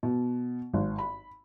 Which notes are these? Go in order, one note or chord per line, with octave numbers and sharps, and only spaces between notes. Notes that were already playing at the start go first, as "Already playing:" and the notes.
B2
G#1
B5